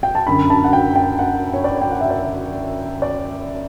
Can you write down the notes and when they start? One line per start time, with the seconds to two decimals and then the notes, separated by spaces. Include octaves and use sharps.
0.03 G5
0.15 A5
0.27 F#2 D3 B5
0.50 A5
0.64 F#5
0.73 G5
0.96 G5
1.19 F#5
1.54 C#5
1.64 D5
1.81 G5
1.91 F#5
2.01 E5
2.10 D5
3.02 D5